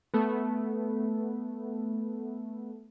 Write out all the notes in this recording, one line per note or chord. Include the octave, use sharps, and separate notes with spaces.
A3 B3